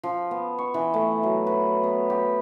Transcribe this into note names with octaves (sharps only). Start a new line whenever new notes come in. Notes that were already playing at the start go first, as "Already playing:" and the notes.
F3
B3
C#6
E3
A3
F#3
B4
B3
G4